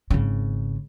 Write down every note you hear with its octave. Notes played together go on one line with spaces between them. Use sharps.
G#1 C#3